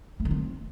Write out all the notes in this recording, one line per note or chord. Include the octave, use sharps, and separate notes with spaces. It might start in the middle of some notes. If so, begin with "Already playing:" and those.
A3
D#3
C4